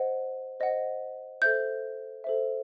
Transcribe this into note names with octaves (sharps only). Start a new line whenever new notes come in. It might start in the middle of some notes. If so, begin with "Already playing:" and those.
Already playing: C5 D#5 F#5
C5 D#5 F#5
A4 C5 E5 G6
A4 C5 E5